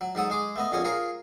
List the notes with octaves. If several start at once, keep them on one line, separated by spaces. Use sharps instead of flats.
F#3
G#2 F#3 A4 D#6
G#3 G#4 D6
A3 B3 D#5
A#1 F2 B2 C#4 C#5 D#6
F4 G#4 A#4 C#5